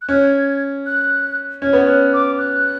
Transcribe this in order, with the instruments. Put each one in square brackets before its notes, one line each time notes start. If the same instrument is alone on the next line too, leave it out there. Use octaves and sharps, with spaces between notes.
[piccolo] F#6
[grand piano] C#4 [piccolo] G#6
[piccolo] F#6
[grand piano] C#4 [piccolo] G#6
[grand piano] B3
[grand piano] C#4 [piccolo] F#6
[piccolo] D6
F#6